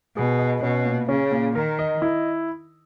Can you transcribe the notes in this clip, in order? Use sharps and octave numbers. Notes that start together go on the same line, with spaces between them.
B2 G#4
D#5
B2 C#4
A#2
C#3 C#4
A#2
D#3 A#4
D#5
E4